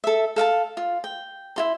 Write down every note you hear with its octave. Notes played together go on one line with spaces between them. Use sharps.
A4 E5
A4 F5 F#5 A5
F4
G5
E4 F4 C6